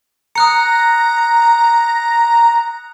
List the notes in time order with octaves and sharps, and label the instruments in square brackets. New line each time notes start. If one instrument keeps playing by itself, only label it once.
[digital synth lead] A#5 [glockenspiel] D#6 F#6 C#7